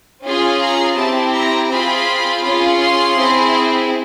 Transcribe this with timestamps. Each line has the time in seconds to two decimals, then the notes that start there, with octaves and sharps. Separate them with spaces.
0.24 C#4 F4 G#4
0.60 A#5
0.96 C4 E4 G4 A5
1.33 A#5
1.70 C4 F4 G#4 B5
2.43 C#4 F4 G#4
2.80 C6
3.17 C4 E4 G#4